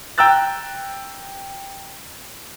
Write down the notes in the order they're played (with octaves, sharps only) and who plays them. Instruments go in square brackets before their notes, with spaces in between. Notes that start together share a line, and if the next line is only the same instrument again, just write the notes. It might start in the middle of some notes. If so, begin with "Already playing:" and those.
[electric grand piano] G5 A#5 E6 F#6 A6